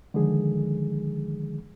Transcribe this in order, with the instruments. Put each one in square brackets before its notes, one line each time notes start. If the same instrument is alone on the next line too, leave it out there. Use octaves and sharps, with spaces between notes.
[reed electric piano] D3 D#3 F3 G#3 G#4